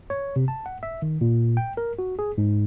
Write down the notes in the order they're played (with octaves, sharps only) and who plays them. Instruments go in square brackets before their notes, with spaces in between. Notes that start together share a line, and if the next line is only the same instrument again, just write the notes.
[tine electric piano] C#5
C3
A5
F#5
E5
D#3
A#2
G5
A#4
F#4
G#4
G#2